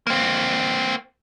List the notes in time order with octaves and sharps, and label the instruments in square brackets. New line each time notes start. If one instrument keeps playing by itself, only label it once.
[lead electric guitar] A#3 C4